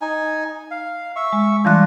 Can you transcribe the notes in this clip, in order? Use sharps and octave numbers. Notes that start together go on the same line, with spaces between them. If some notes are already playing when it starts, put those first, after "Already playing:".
D#4 G#5
F5
E5 C#6
G#3
E3 G3 D4 F4 F#6